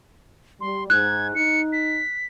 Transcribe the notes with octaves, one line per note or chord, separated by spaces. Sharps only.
G3 C6
G#2 F#6 G#6
D#4 C#7
B6